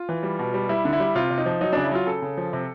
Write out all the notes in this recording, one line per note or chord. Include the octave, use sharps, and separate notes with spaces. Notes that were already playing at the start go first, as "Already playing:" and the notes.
Already playing: F4
E3
G3
B2
G3
G3 E4
D3
E4
G3
C3 F4
C3
D#4
F3
F#3 D#4
C#3 D4
E4
F#3 F4
C#3 A4
C#3
F3
C3